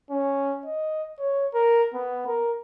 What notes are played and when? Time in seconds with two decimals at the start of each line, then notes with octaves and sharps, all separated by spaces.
0.10 C#4
0.66 D#5
1.19 C#5
1.54 A#4
1.94 B3
2.27 A#4